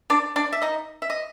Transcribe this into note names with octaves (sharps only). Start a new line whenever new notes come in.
D4 D5
D4 D5
E5
D#4 D#5
E5
D#5